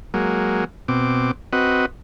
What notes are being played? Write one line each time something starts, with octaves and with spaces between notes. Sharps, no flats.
F#3 G#3 A#3
B2 C4 D6
C4 F#4 B4 D#5